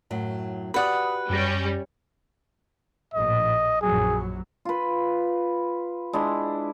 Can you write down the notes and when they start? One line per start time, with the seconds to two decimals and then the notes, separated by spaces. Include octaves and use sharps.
0.10 F#2 A2 F#3
0.74 F#4 G4 B4 D5 F#5 B5 D#6
1.30 F#2 G3 C#4 A#6
3.14 A#1 A2 D#5
3.82 A#1 F#2 F#3 G#4
4.65 F4 B4
6.13 G#3 D4 E4